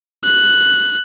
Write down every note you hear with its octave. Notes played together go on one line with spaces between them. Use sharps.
F#6